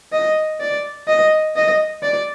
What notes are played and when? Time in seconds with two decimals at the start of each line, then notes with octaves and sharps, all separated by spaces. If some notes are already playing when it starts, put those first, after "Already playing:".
0.12 D#5
0.60 D5
1.08 D#5
1.56 D#5
2.02 D5